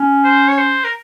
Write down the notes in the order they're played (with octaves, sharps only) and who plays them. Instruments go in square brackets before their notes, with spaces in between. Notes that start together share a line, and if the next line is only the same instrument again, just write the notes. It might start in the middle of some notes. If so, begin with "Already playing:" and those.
Already playing: [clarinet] C#4
[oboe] C5
C#5
C5
A#4